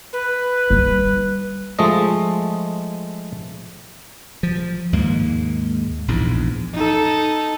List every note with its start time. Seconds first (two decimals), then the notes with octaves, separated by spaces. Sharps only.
0.13 B4
0.70 G3 D#4
1.79 F3 G#3 A3 D#5
4.43 F3
4.92 D#2 G#2 G#3 A#3
6.08 A#1 E2 G#2
6.74 D#4 A4